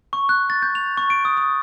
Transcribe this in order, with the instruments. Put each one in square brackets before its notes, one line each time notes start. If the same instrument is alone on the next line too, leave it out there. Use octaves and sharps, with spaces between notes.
[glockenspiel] C#6
F#6
A6
G6
F7
C#6
D7
D#6
D#6